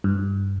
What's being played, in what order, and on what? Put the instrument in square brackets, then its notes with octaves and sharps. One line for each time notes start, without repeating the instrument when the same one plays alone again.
[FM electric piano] G2